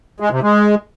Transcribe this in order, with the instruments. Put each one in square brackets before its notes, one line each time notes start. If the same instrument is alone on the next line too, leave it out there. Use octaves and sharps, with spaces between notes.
[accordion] G#3
C3
G#3